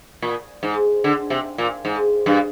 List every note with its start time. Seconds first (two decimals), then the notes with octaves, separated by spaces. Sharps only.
0.22 A#2
0.63 G#2
1.04 D3
1.30 C3
1.58 A#2
1.85 G#2
2.26 G2